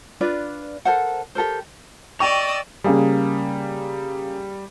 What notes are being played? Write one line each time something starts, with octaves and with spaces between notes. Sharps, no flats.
D4 F4 B4 D5
A4 A#4 C5 F#5
G4 A4 A#4 C5
D5 D#5 G5 C#6 E6 F7
C#3 G3 A#3 G#4